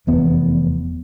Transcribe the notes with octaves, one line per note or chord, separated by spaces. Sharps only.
F1 E2 B3